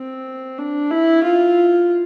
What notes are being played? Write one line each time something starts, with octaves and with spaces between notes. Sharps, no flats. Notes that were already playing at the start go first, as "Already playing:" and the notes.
Already playing: C4
D4
E4
F4